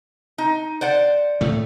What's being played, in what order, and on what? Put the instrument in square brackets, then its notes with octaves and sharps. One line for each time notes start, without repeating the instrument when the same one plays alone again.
[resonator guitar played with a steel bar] D#4
C5 D5 F#5
[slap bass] A2 A3